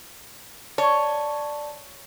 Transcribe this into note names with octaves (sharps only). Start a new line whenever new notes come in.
C#5 D5 A5 C#6